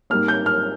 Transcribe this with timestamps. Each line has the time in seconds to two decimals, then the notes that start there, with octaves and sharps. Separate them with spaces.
0.10 G#2 G3 A#3 F6
0.28 G6
0.46 F6